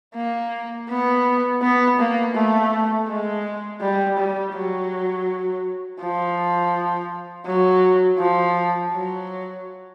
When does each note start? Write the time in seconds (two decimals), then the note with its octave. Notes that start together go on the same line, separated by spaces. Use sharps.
0.15 A#3
0.89 B3
1.62 B3
1.98 A#3
2.35 A3
3.08 G#3
3.81 G3
4.18 G3
4.54 F#3
6.00 F3
7.46 F#3
8.19 F3
8.92 F#3